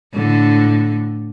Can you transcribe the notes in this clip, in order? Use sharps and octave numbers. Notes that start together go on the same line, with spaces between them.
A2 D3